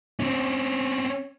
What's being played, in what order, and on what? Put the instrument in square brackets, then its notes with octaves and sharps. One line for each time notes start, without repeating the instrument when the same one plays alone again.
[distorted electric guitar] C4 C#4